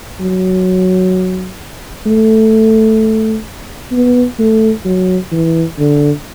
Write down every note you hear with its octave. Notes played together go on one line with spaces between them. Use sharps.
F#3
A3
B3
A3
F#3
E3
D3